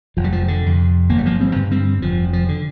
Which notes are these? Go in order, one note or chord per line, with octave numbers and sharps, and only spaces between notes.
F1 F3
G3
F3
D3
F2 C3
G1 A#3
G3
F3 A#3
G3 C4
G2 D3
G3 C4
F1 F3
F3
D3